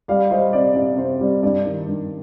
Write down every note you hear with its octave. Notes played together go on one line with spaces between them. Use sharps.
G3 D5 F5
G3 C5 D#5
C3 D5
C3 D5
C3 C5
G3 D5
G2 D5
D#3
G2